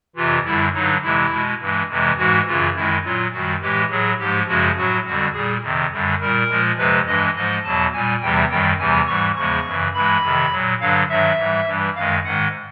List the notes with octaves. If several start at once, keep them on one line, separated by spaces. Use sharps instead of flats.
F2 C3 E3 F4
F#2 D3 G3 E4
G2 D3 F#3 D#4
F2 C3 E3 G#3 E4
B2 G#3
G2 E3 G#3
F2 C3 E3 G#3
G#2 E3 G#3 F#4
F#2 C#3 E3 F4
F#2 D#3 G#3 E4
A#2 F#3 F4
F#2 D#3 G3 F#4
A2 E3 G#3 G4
A2 F#3 G#4
G#2 F3 G#3 G4
F#2 C#3 F3 G#3 F#4
A2 F#3 F#4
F2 D3 G3 F#4
A#2 G3 G#4
F2 C3 D#3
F#2 D3 G3
A#2 G3 A#4
A#2 F3 G#3
F2 C3 F3 G#3 B4
G2 E3 G#3 D#5
G#2 F3 G#3 D#5
E2 B2 F#3 A5
A#2 G3 G#5
E2 C3 E3 G3 G5
F#2 D#3 G3 G5
E2 C3 E3 G3 G#5
G#2 E3 G3 C#6
E2 C#3 F3 G#3 C#6
F#2 C#3 E3
G2 E3 G#3 B5
F2 C3 D#3
A#2 F#3
G2 D3 F#3 F5
G2 D#3 F#3 E5
G#2 E3 G3
G2 E3 G3
F#2 D#3 G#3 F5
G#2 D#3 G#3 F#5